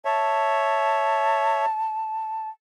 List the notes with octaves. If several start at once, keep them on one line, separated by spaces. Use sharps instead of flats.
C#5 E5 A5